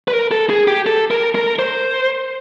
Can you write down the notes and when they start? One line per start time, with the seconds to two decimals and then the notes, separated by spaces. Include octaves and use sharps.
0.08 B4
0.13 A#4
0.31 A4
0.50 G#4
0.68 G4
0.86 A4
1.11 A#4
1.35 A#4
1.59 C5